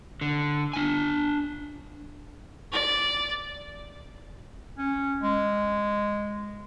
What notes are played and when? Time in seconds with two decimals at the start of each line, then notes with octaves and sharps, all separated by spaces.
0.21 D3
0.73 D4 G#5
2.72 D5
4.78 C#4
5.22 G#3